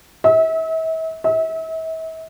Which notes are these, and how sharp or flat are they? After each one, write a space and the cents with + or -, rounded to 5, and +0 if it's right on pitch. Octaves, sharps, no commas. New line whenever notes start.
E5 -40
E5 -40